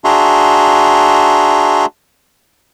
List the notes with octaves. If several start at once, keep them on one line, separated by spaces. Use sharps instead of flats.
D4 F#4 G#4 E5 A#5 C6